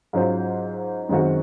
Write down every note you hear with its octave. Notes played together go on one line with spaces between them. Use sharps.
G#2 F#3 C#4 F4 C5
F#2 D#3 G#3 C4 F#4